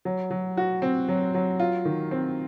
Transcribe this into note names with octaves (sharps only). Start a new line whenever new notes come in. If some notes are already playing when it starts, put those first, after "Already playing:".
F#3
F#3
F#4
C4
F#3
F#3
F4
D#3
C4